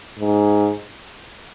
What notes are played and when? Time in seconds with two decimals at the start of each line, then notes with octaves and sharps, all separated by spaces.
0.19 G#2